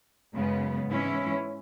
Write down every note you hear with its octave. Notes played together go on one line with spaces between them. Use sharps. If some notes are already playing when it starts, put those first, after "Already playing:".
F#2 C#3 G#3 B3
G#2 E3 G#3 C#4 E4